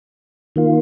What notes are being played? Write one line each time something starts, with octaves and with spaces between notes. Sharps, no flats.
D#3 A#3 F4